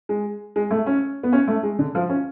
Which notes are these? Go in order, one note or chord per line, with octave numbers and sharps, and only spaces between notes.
G#3
G#3
A3
C#4
B3
C#4
A3
G#3
D3
F3
C#4